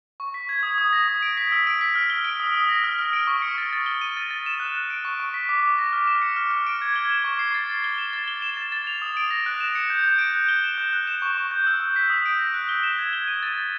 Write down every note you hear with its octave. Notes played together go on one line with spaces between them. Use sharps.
C#6
B6
G#6
D#6
D#6
A#6
D#6
D7
B6
E6
D7
B6
F6
G7
D7
D#6
D#6
A#6
F6
F6
D7
C#6
C#7
A6
A6
G7
D#7
A6
A6
E7
F#6
F#6
D7
C#6
C#6
B6
D6
D6
A#6
F6
E7
C#7
F6
F6
D7
G#6
G7
E7
C#6
C7
A6
A6
G7
E7
A6
G7
E7
A6
A6
F7
D#6
D7
A#6
F#6
E7
C#7
G6
G6
D7
F#6
G7
E7
F#6
F#6
E7
C#6
C#6
G6
E6
E6
B6
D#6
D7
A#6
F#6
G7
E7
G#6
G7
D#7
A6
A6